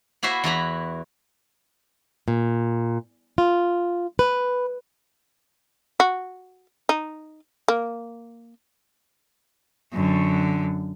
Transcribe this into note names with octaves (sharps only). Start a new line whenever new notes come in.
A#3 E4 F#4 C5 E5
E2 E4 A#5 B5
A#2
F4
B4
F#4
D#4
A#3
F#2 D3